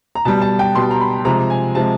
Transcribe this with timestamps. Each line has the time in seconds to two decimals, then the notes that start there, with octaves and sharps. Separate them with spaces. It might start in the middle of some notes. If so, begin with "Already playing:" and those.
0.15 A#5
0.25 B2 G3 A5
0.42 A5
0.59 G5
0.75 B2 G3 C6
0.91 A#5
1.01 B5
1.25 C3 F3 G#3 A#5
1.50 G#5
1.75 C3 F3 G#3 A5